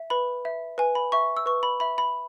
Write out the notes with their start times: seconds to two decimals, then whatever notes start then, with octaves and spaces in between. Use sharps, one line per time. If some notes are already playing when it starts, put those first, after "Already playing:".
Already playing: E5
0.10 B4 B5
0.45 E5
0.78 B4 G#5
0.95 B5
1.12 E5 C#6
1.37 E6
1.46 B4 C#6
1.63 B5
1.80 E5 B5
1.98 B5